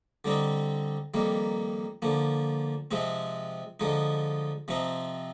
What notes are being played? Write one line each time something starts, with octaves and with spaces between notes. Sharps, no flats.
D3 G3 C4 D#4
F2 D#3 G3 A#3
D3 F3 A#3
C3 F3 G#3 C4
D3 F3 G#3 D#4
C3 F3 C4 D#4